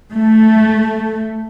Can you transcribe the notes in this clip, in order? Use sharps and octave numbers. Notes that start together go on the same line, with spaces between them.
A3